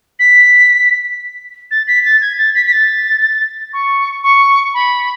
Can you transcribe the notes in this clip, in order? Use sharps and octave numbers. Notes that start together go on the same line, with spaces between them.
B6
A6
B6
A6
G#6
A6
B6
B6
A6
C#6
C#6
B5